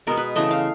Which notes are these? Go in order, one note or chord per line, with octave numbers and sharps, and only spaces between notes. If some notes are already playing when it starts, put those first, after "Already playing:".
B2 G#3 B3 A#4
B4
C#3 E3 A3 D#5
F5